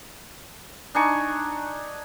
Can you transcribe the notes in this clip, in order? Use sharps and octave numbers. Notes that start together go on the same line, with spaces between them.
D4 D#4 G#5 C#6